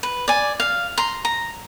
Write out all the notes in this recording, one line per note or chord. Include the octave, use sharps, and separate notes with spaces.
B4
D5 G#5
F5
A#5 C6
A#5